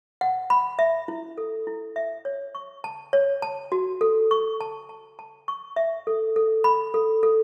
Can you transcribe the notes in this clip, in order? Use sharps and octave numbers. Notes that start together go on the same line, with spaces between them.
F#5
B5
E5
E4
A4
E4
E5
C#5
C#6
A5
C#5
A5
F#4
A4
C#6
A5
A5
A5
C#6
E5
A4
A4
B5
A4
A4